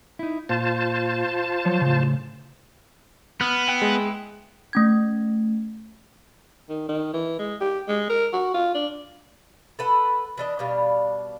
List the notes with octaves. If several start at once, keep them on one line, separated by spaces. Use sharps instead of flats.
D#4 E4
A#2 F4 C5 A5
F3 F#3 C#5
A2 C#3
B3 F6 F#6
E4 G5 F#6
G#3
A3 C#4 G#6
D#3
D#3
E3
G#3
G4
G#3
A#4
F#4
F4
D4
A4 B4 F#5
E3 D4 D#5
B2 G3 D4 F5